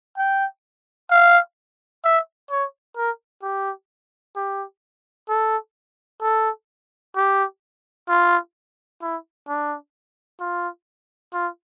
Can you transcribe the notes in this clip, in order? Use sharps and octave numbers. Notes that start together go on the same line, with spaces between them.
G5
F5
E5
C#5
A#4
G4
G4
A4
A4
G4
F4
E4
D4
F4
F4